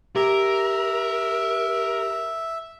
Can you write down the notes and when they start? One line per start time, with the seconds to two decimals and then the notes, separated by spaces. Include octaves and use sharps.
0.16 G4 A#4 E5